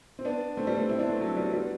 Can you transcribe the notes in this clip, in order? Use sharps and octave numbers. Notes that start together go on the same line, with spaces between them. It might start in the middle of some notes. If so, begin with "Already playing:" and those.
C4
B3 D4
A3 C4
G3 B3
A3 C4
C4 E4
B3 D4
A3 C4
F#3 A3
G3 B3
G3 B3